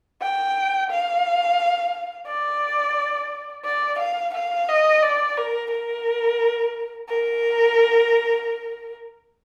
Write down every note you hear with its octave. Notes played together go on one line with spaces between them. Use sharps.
G5
F5
D5
D5
F5
F5
D#5
D5
A#4
A#4
A#4